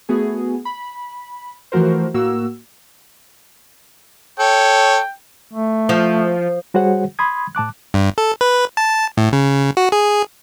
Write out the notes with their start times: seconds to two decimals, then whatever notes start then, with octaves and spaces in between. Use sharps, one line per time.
0.09 A3 B3 F#4 G#4
0.65 B5
1.72 E3 F3 A3 F#4 A#4 C5
2.14 A2 A#3 F#4 E6
4.39 A4 C#5 G5
5.54 A3
5.89 F3
6.74 G3 F#4 G#4 C5 C#5 F#5
7.19 B5 C6 D#6 G#6
7.55 A2 A5 D6 F#6
7.94 G2
8.18 A4
8.41 B4
8.77 A5
9.17 A2
9.33 C#3
9.77 F#4
9.92 G#4